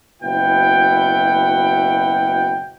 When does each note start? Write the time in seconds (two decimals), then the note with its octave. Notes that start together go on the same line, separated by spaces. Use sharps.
0.22 F#1 B2 E4 F#5 G5